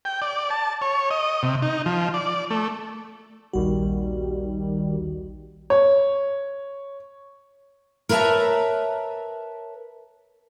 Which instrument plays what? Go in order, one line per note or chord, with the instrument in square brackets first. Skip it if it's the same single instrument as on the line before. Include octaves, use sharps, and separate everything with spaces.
[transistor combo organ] G5
D5
A5
C#5
D#5
C3
D#4
F3
D5
A3
[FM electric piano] A#1 F#4 [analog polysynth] D#2 D#3 G3
[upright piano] C#5
[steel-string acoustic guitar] A#4 B4 C#5 E5 A5 A#5